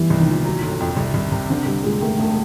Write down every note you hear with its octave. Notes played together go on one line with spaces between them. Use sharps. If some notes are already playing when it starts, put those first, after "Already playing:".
Already playing: E3 G3 B3
C2
D#3
A#2
F#3
G1
F2
C2
C2
C3
D3 C4
C2 G3
A#2 G#3
D#3 A3
E1 A3